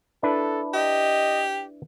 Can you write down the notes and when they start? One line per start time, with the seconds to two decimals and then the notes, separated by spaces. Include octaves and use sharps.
0.23 D4 E4 A4 B4
0.74 G4 D#5